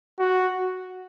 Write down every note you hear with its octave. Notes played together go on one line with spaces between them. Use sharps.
F#4